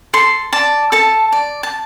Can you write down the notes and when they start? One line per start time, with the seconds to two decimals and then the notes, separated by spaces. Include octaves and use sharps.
0.13 A4 C6
0.53 D5 A5
0.92 A4 A5
1.32 D5
1.63 A5